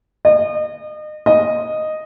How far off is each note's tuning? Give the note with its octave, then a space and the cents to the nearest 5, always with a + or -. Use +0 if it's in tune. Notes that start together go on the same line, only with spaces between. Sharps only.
D#5 -35
D#5 -5